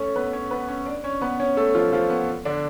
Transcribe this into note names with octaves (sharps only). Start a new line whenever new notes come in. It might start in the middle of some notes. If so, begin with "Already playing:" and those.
Already playing: A3 C#4 A4 C#5
B3 B4
C#4 C#5
B3 B4
C#4 C#5
D4 D5
C#4 C#5
B3 B4
C#4 C#5
A3 A4
F3 F4
F3 F4
B3
D3 D4